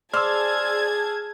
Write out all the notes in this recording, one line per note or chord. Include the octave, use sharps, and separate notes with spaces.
G#4 C5 D5 A5 E6 F6 G#6